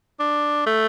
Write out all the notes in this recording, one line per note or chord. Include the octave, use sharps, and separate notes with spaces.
D4
A3